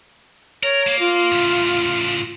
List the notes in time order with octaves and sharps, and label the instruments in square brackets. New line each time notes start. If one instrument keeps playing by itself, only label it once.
[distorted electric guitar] A#4 [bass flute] C#5
[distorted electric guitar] A#3
[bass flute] F4
[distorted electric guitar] A2 C#3